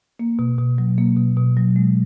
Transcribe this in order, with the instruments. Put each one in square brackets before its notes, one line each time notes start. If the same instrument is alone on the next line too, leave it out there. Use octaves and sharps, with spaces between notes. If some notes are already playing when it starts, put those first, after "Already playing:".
[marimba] A#3
B2
B2
F#3
A#3
B2
B2
F#3
G#3